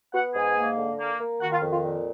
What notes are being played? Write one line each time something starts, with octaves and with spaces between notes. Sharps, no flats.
B3 F#4 F#5
G#2 G#4 G#5
A#3
D3
A#3
A#3
D#3 F#4 F#5
F4 F5
F2
F4
A#2